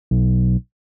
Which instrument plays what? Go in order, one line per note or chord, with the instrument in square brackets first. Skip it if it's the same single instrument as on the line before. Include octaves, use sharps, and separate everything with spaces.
[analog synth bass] B1